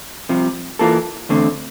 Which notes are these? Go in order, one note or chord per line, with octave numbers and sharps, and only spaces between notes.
C2 C3 F3
E3 A#3 F4 A4
E2 D3 A3 C4